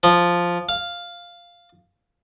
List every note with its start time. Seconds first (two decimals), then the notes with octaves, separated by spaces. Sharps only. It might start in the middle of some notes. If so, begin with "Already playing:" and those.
0.03 F3
0.69 F5